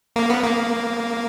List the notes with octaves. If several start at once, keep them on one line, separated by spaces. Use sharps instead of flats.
A#3
B3
A#3